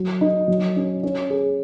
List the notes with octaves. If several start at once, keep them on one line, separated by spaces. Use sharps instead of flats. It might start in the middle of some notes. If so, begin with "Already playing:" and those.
Already playing: F#3
D#4
F#3
C#4
C#4
G#4